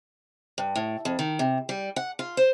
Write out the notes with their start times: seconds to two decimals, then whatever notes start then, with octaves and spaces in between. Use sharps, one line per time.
0.58 G2
0.76 A2
1.05 F2
1.19 D#3
1.39 C3
1.69 G3
1.96 F#5
2.19 F4
2.37 C5